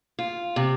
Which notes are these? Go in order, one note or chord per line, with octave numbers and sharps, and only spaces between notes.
F4
C3